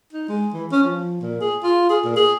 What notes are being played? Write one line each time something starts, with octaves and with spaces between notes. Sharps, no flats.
D#4
G#3
E3
C#4
F3
A#2
G#4
F4
G#4
A#2
G#4